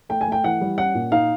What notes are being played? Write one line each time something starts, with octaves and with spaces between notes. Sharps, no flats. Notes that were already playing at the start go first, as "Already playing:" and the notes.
A3 G5
G#5
A3 G5
E3 F#5
G3
C#4 F#5
A#2
D#4 F5